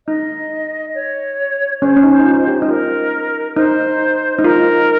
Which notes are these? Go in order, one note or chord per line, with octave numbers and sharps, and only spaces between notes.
D#4 D#5
C#5
C#4 C5
C#4
D#4
D#4
F4
G4
D#4
F4 A#4
D#4 C5
D#4
F4 A#4